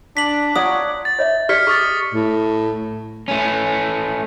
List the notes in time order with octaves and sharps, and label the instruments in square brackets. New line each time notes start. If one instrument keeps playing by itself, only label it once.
[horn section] D4 [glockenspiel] B6 F#7
[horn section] F4 C#5 [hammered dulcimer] D5 F#5 A#5 [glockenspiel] D#6
[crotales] A6
[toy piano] C#5 D#5 E5
[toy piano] G4 G#4 D5 [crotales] F6 B6 C#7
[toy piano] G#4 [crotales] C#6 D#6 A6
[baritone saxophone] A2
[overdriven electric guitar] A3 C#4